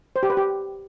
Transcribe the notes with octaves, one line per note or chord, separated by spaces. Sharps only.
C5
G4
B4
G4